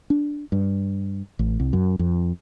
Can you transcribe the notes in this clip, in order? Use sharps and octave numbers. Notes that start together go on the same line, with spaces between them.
D4
G2
A1
C2
F#2
F2